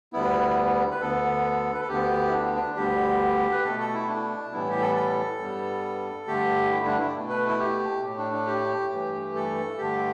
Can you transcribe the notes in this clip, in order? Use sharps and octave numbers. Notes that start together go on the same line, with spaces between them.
D2 D3 G3 B3 E4
B4
D2 D3 B3 A4
B4
A4
D2 D3 B3 G4
E4
D4
D4
D2 D3 G3 B3 G4
B4
B2 A3 A4
A4
E4
D4
A2 E3 G3 B3 E4
G4
A4
A4
G2 G3 B3
G2 D3 A3 G4
E4
D4
E4
B2 A3
B4
E4
G4
A2 A3
D4
D4
G4
G2 E3 A3
A4
G2 D3 A3 G4